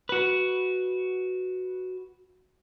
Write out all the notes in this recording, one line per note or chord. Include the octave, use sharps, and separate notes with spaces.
F#4 B4